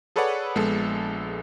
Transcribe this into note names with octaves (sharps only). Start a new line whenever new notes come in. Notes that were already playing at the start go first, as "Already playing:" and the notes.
G#4 A4 B4 C#5 D5 F#5
A#1 G#3 B3 A4